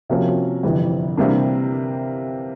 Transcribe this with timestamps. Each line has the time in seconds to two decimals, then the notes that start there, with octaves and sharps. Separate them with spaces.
0.09 C3 F3 A#3 C#4 F#4
0.63 G1 F2 C3 E3
1.17 C3 E3 G3 A#3 D4